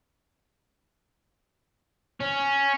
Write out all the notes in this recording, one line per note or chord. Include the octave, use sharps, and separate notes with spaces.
C#4